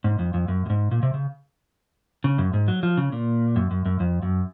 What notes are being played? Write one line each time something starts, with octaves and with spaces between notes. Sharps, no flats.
G#2
F2
F2
F#2
F#2
G#2
A#2
C3
C#3
C#3
F#2
G#2
F#3
F3
C#3
A#2
F#2
F#2
F#2
F2
F#2